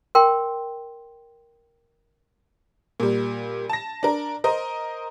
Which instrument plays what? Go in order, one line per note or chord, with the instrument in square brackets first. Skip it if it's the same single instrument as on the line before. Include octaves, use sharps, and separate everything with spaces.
[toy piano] A#4 G5 C6
[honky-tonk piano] A#2 G3
A5 A#6
D4 A#4
A#4 C5 D#5